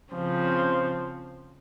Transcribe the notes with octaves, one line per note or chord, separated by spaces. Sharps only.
C#3 F3 C4